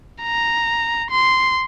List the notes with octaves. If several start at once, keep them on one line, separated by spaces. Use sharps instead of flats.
A#5
C6